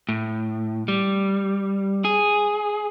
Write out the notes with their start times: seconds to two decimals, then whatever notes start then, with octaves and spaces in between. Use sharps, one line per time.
0.09 A2
0.88 G3
2.05 G#4